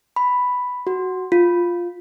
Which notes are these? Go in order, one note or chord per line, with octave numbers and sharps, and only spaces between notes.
B5
F#4
F4